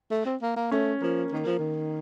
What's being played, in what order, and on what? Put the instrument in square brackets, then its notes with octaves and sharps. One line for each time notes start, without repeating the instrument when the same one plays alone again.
[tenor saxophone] A3
C4
A#3
A#3
[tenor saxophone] A3 [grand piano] C#4
[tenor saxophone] F3 [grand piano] A#3
[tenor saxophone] D#3 [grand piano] A#3
[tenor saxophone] F3
D#3